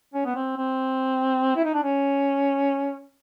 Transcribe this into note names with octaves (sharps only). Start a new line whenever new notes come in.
C#4
B3
C4
C4
E4
D#4
D4
C#4